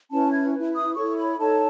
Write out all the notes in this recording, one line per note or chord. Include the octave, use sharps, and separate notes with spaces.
C#4 E4 B4 A5
G#6
E4 B4
D#6
E4 A4 C#5 C#6
B5
D#4 A4 C#5 A5